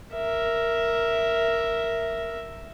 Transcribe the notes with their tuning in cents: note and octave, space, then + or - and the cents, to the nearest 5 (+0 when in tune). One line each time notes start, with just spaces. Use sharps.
A#4 +0 E5 +0